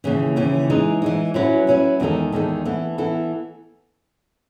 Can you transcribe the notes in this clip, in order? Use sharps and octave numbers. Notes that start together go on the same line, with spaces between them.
D#2 C#3 E3
D#2 C#3 E3
E3 G#3 D#4
E3 G#3 D#4
F#3 C#4 E4 B4
F#3 C#4 E4 B4
E2 D#3 G#3 D#4 A4
E2 D#3 G#3 D#4 A4
E3 B3 E4 A4
E3 B3 E4 A4